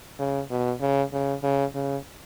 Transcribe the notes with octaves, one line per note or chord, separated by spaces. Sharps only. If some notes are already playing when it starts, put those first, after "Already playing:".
C#3
B2
C#3
C#3
C#3
C#3